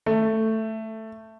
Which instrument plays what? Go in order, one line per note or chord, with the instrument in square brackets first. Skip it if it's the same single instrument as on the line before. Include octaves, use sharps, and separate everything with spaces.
[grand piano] A3